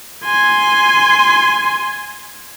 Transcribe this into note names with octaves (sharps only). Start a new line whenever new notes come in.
G#5 C6